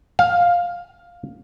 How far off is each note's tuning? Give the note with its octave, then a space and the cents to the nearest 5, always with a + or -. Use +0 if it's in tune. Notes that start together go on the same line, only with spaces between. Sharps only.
F5 +10